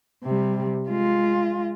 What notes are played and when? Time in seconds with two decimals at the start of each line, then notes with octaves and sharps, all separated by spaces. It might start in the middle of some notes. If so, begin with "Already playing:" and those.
0.24 C3 G3
0.89 G#3 F4